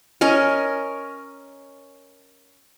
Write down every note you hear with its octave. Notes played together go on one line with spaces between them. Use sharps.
C#4 A#4 D#5